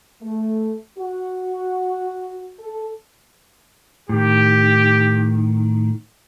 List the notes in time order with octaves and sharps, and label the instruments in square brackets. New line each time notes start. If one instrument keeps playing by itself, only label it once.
[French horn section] A3
F#4
A4
[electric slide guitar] A2 D#3 [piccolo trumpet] G4